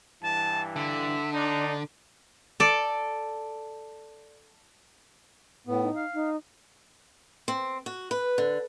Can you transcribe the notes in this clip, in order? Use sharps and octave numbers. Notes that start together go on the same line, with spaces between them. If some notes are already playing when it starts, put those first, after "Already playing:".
G2 E3 A5
D3 E5
D4 D#4
A4 D5
A2 B3
D#4
F5
D#4
C4
F#4
B4
D3